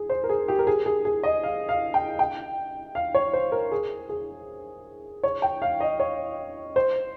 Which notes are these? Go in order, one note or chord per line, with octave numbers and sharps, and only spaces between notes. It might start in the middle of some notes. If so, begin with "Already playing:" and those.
Already playing: G#4
C5
A#4
G#4
G4
A#4
G#4
G#4
G#4
D#5
F5
F5
G5
G5
F5
C#5
C5
A#4
G#4
G#4
C#5
G5
F5
D#5
C#5
C5